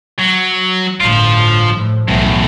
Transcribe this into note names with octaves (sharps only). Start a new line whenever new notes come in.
F#3
G1 A2 F3 F4
A2 F3
B1 E2 A2